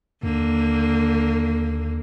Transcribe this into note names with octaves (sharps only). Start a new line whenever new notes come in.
D#2 D3 A#3